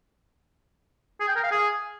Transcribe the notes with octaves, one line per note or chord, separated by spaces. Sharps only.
G#4
G5
A#4
F5
G#4